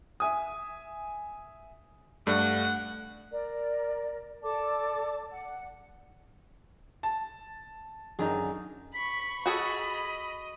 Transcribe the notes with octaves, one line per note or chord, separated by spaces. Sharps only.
E5 G#5 D#6
G2 A3 D5 F#5
A#4 D5
A4 D5 A5 D6
F#5
A5
F#2 D3 D#3 D#4 G#4
B5 C#6 B6
F#4 G#4 A4 D#5 B5